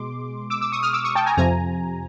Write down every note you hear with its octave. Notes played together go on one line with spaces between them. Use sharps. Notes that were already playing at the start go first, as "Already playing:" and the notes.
Already playing: B2 G#3 C6 D6
D6 E6
D6 E6
C#6 D#6
D#6 F6
D6 E6
C#6 D#6
G5 A5
G#5 A#5
F2 C3 F3 G#5 A#5